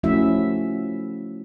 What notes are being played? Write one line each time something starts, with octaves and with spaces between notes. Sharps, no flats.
F3 A3 C#4 E4 F#4 E5